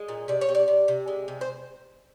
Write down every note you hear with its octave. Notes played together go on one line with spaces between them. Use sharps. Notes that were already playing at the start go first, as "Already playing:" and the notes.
Already playing: G#3 D#5
A#2
C3 D5
C#5
C3
D5
C3
C3
G#3
C3
C5